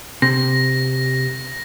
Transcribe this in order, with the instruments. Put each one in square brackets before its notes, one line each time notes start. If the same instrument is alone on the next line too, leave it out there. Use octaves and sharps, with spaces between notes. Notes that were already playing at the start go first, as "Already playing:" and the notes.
[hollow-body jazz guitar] C3 [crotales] A#6